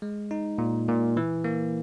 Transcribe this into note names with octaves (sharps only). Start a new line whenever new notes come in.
G#3
D#4
A#2
A#2
E3
A#3